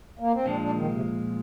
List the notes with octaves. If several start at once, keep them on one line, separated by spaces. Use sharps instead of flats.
A#3
C4
A#2 F3 G#3 D4
D4
D#3
C3